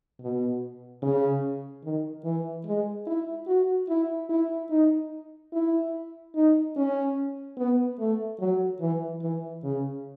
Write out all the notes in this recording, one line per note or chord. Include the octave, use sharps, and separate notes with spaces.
B2
C#3
D#3
E3
G#3
E4
F#4
E4
E4
D#4
E4
D#4
C#4
B3
A3
F#3
E3
E3
C#3